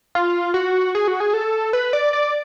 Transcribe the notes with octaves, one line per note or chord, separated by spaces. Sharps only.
F4
F#4
G#4
F#4
G#4
A4
B4
D5
D5